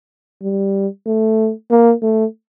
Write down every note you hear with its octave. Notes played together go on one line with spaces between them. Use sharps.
G3
A3
A#3
A3